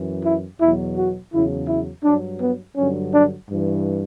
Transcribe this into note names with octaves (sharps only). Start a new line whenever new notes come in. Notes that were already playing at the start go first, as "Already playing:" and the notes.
Already playing: F#2 E3
E4
E2 B2 F#3 E4
F#4
E2 C#3 F#3 E4
E4
G2 F#3 D4
B3
G2 D3 F#3 C#4
D4
G2 E3